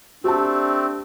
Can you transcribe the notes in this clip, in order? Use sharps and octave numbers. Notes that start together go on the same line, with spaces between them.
A3 C4 D4 G4 A5